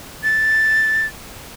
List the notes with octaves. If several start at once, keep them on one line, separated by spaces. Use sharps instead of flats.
A6